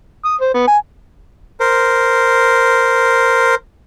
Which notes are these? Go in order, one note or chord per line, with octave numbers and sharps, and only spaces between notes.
D#6
C5
B3
G#5
A#4 C5